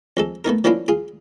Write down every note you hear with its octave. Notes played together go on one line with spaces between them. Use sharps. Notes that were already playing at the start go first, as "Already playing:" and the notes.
F2 G#3 A4
A3 B3 D#4 A#4
F3 A#3 C#4 D4 E4 F4
F4 G#4